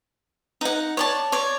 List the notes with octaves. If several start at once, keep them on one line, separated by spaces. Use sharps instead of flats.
D#4 F#5
C#5 D5 A5
C#5 D5